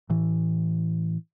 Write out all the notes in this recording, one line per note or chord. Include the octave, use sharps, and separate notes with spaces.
A2 E3